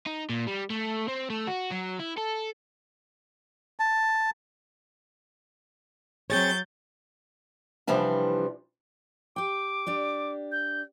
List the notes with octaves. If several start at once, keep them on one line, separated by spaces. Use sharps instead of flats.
D#4
A#2
G3
A3
C4
A3
F#4
F#3
E4
A4
A5
F#3 C4 G#4 C#5 G6 A6
C3 E3 F3 G3 D4
G4 G5 D6
D4 G4 D5
G6